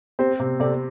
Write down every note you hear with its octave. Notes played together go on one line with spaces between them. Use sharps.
C4 G4 C5
C3
C3 A4 D5